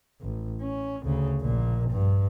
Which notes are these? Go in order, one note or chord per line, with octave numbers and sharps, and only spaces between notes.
A1
C#4
D2 C#3
A#1 A#2
G2